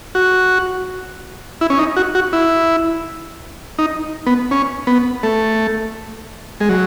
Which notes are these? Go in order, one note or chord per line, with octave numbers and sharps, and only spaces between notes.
F#4
E4
C#4
D#4
F#4
F#4
E4
D#4
B3
C#4
B3
A3
G#3
F#3